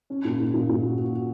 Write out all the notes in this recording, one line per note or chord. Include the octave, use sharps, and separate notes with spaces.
C#4
A#2
A#2
A#2
A#2
F#4
F#4
F#4